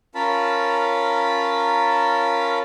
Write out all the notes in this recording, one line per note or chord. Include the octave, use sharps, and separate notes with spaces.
C#4 F4 A#4 A5 B5